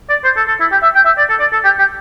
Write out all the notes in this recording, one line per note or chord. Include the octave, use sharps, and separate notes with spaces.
D5
C5
A4
A4
E4
G4
E5
G5
E5
D5
A4
D5
A4
G4
G4